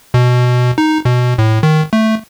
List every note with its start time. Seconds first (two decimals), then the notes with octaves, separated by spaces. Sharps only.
0.14 B2
0.78 D#4
1.05 B2
1.38 A2
1.63 D#3
1.93 A3